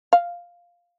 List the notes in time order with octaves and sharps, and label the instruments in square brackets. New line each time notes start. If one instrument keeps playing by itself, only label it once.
[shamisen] F5